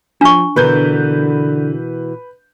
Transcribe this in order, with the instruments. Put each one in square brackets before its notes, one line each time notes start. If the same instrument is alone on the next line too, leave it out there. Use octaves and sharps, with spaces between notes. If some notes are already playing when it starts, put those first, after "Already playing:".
[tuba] F3 [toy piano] D4 C#6
[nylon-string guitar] B2 E3 A#4 [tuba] D3 [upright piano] B4 G6